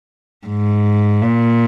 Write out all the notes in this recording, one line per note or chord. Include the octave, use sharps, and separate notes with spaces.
G#2
A#2